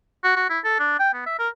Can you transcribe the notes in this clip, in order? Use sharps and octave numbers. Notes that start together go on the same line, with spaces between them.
F#4
F#4
E4
A4
D4
G5
B3
E5
A#4